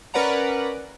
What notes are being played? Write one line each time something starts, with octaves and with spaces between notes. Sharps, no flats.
C#4 A#4 B4 D5 F#5 A#5